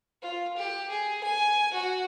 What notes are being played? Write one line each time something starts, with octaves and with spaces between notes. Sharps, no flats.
F4
G4
G#4
G#5
F#4